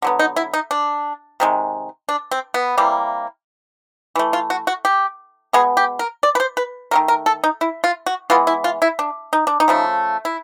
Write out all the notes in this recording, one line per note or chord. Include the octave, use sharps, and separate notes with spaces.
D3 F#3 B3
D#4
E4
D#4
D4
C3 D#3 G#3
D4
C4
B3
C3 E3 G3 A#3
E3 A3
F4
F#4
F#4
G4
B2 G#3 B3 G#4
G4
A#4
D5
B4
C5
B4
D#3 F#3 A3 A#4
A#4
A4
D#4
E4
F4
F#4
E3 G#3 B3 F4
E4
F4
E4
D4
D#4
D4
D#4
C#3 F3 A3
E4